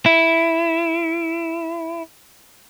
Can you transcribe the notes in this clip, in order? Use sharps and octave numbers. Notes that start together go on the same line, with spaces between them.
E4